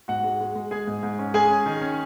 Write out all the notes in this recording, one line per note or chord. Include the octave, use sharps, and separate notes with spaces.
G#2 F#4 F#5
G#3
G#3
G#3
G#3 G#4 G#5
G#2
G#2
C#4
G#3 G#4 G#5
C#4
D#3
C#4